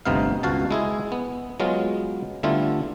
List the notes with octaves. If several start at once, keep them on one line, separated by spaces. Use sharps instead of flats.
G1 D2 C3 B3 D#4 F5
C#2 B2 F#4 F5 A5
G#3 E4 G#4
B3
F#3 G#3 B3 F4
D3 G3 A3 B3 E4 F4